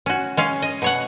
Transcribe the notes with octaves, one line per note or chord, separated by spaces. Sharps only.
C#4 F#4
G#3 C#4 F5
D#5
B2 C#5 F#5